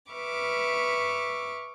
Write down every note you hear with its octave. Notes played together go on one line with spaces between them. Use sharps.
B4 E5 C#6 D6 F6